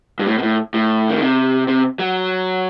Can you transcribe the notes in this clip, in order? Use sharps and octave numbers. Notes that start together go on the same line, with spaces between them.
G2
A2
B2
A2
A2
D#3
C3
C3
F#3